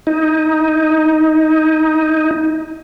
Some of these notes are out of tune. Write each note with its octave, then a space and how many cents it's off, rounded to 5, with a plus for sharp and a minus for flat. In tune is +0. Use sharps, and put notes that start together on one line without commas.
D#4 +15